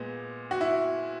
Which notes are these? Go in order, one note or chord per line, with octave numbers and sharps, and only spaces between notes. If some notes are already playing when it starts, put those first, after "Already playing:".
Already playing: A#2 G#3 B3
F#4
E4